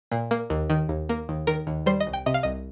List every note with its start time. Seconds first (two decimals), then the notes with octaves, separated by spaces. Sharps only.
0.12 A#2
0.31 A#3
0.50 D#2
0.70 D#3
0.89 D#2
1.09 A#3
1.29 D#2
1.47 D#3 A#4
1.67 D#2
1.86 G3 C5
2.00 D#5
2.07 C2
2.13 G5
2.26 C3 D#5
2.34 F5
2.43 C2 D#5